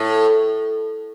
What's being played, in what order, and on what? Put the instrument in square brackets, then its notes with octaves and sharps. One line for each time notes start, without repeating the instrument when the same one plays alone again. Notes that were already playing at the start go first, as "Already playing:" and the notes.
Already playing: [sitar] A2